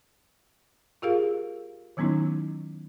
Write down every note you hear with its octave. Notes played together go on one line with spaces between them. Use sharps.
F4 G4 G#4 A#4 F5
D#3 F#3 B3 C#4 D#4 E4